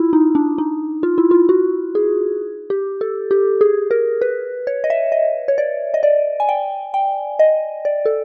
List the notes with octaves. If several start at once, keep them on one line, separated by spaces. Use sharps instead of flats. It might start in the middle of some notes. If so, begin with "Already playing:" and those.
Already playing: E4 F4
D#4
D4
D#4
F4
E4
F4
F#4
G#4
G4
A4
G4
G#4
A#4
B4
C#5
D#5
E5
D#5
C#5
D5
D#5
D5
G#5
G5
G5
D#5
D5
A4